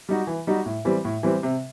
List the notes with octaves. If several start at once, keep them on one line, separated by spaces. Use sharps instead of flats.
G3 D#4 F#4
E3
G3 D#4 F#4
A2
E3 G3 C4
A2
E3 G3 C4
C3